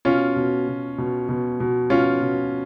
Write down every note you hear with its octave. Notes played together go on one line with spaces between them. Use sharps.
B2 C#4 F4
B2
B2
B2
B2
B2
B2 C#4 F4
B2